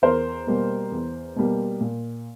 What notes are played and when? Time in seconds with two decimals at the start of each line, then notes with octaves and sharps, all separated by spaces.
0.02 E2 A#4 C5
0.47 B2 G3 A#3
0.92 E2
1.36 B2 G3 A#3
1.81 A#2